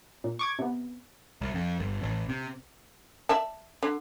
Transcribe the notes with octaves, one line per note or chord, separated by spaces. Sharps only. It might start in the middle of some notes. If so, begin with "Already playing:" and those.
A#2
C#6 D6 G#6
C3 B3
C2
F2
G1
A1
C3
D5 E5 A5
D3